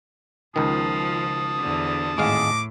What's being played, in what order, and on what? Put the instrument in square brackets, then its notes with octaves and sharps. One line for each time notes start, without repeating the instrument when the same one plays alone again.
[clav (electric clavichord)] C#2 D#3 [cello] F3 [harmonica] A5 D#6
[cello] E2 D3
[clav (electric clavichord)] G#1 G#3 F5 [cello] A2 [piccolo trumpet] D6